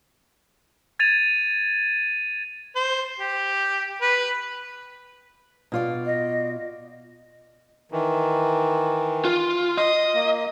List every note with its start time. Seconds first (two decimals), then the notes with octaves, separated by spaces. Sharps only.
0.99 G#6 A6 D#7 F7
2.76 C5
3.20 G4
4.01 B4
5.72 B2 F4 D5
6.06 D#5
7.92 D#3 E3
9.25 F4
9.77 D#5 C6
10.14 A#3